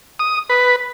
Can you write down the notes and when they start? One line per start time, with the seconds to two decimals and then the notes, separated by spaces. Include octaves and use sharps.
0.19 D#6
0.50 B4